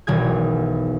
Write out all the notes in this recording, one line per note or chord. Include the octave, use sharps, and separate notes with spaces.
E1 B1 D#3 G#4 G#6